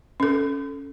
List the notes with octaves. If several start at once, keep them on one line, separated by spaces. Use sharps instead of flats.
C#4 A4